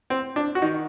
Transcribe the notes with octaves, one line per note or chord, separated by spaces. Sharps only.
C4
D4
F#4
D#3 D#4